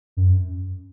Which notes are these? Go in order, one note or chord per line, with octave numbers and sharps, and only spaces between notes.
F#2